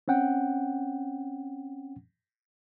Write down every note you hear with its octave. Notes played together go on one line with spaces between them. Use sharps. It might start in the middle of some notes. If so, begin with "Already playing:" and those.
C4 C#4 F#5 G5